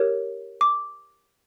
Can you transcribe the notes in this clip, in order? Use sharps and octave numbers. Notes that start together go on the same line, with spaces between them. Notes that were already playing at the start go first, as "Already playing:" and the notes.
Already playing: G4 A#4 C#5
D6